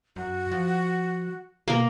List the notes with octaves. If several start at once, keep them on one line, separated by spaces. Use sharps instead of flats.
F#2 F#4
F3
B2 A#3 A#4